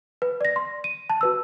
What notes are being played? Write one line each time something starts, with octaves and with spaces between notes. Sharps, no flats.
B4
D5 A#6
C6
D#7
A5
F#4 B4 E6